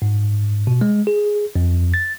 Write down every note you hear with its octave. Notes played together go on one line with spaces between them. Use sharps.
G#2
B2
G#3
G#4
F2
A6